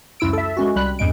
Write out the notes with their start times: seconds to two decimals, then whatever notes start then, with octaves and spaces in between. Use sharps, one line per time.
0.20 C#2 F#2 E4 E6 D7
0.33 A4 E5
0.57 G#3 C#4 F#4
0.76 C2 G3 B5 F#6
0.99 E2 G2 G#3 D7